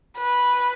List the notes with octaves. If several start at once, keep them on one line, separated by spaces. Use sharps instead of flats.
B4